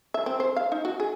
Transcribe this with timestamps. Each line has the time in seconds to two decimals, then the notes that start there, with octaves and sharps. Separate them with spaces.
0.14 E5
0.26 C4
0.40 C5
0.56 F5
0.72 D#4
0.85 F#4
1.00 G#4